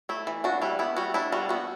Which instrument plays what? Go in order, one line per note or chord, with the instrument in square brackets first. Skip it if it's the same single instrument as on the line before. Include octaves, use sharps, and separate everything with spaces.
[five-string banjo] A3 E4
E3
D4 F#4
G3 E4
B3 E4
G3 F#4
D4 E4
G3 F#4
B3 F#4